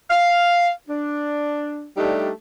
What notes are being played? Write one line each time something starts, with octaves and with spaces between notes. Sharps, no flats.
F5
D4
G3 A3 D4 D#4 G4